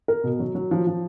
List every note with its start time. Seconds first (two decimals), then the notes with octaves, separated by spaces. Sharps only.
0.08 A#4
0.24 B2
0.40 F#3
0.55 F#3
0.71 F3
0.87 F3